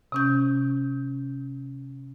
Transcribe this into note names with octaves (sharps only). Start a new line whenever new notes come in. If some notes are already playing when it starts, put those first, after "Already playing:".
C3 C#4 G6